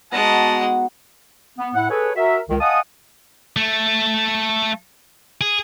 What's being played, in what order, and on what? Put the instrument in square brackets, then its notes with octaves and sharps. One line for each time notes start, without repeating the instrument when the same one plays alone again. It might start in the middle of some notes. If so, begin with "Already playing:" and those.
[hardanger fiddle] G#3 F#5 [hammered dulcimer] B3 D#4 F#4 [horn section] A5
[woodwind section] B3
A2 E4 F#5
G#4 A4 B4 C#5
F#4 A#4 E5
C#2 D#3
D#5 F5 F#5 G#5 A5 D#6
[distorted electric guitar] A3
G#4